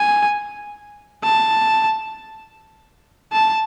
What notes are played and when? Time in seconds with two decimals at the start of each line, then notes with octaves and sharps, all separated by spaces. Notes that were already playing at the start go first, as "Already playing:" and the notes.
Already playing: G#5
1.24 A5
3.32 A5